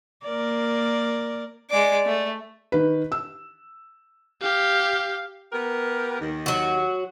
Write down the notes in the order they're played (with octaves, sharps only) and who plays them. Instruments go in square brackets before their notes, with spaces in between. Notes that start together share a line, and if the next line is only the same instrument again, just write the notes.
[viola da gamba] A#3 A#4 D5
[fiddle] G#3 D6 [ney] D5
[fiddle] A3
[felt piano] D#3 B4
E6
[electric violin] G4 F5
[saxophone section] B3 G4 A#4
D#2 D#3
[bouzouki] F#3 F#4